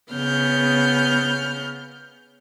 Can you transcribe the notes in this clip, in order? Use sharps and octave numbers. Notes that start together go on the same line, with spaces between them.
C#3 B3 F6 G6